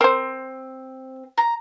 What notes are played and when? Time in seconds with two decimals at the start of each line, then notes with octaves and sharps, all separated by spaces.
0.01 C4 A#4 C5
1.38 A#5